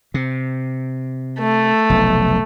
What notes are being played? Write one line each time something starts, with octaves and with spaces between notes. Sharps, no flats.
C3
A3
F1 B1